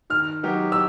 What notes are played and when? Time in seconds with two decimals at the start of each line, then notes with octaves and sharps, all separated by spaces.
0.10 D#3 F6
0.43 F#3 B3 D#4 G4
0.72 E6